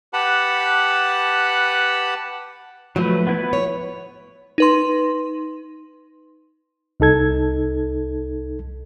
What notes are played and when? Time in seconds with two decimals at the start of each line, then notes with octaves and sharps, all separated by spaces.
0.13 G4 B4 F#5 A5 B5
2.96 F3 F#3 A3 B4
3.27 B3 E4 B4
3.53 C#5
4.58 D#4 B4 C6
7.00 C2 D#4 A4 G#6